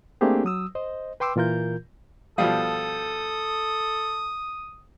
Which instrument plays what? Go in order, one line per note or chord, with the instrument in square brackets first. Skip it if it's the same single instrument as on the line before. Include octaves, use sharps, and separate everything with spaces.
[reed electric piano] A3 A#3 C4 D4 G4 G#4
F#3 D#6 E6
C5 D#5
B4 G5 C6 D6 E6
A#2 E3 F4 A#4 G6
[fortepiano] B2 F3 G3 [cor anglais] A4 [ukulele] F5 [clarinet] D#6